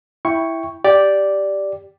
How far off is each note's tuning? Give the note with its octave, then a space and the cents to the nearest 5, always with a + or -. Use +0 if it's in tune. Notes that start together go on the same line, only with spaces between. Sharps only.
E4 +0 G5 +0 C#6 +0
G4 +0 D5 +0